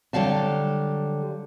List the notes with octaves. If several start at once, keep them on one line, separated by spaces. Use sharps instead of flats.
D3 F#3 G3 F5 A5